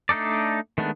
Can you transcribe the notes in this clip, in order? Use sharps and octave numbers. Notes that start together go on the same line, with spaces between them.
A3 D4 D#4 A4 D5
D#3 G#3 A3 B3 D4